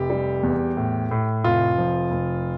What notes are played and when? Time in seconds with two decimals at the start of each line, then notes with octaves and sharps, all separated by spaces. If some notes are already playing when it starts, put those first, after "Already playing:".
Already playing: F1 G4
0.10 G3
0.43 E2
0.77 A2
1.11 A2
1.44 F1 F4
1.78 F3
2.11 F1